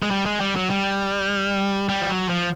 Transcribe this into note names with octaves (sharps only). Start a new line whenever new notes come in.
G#3
G3
G#3
G3
F#3
G3
G3
F3
F#3
F3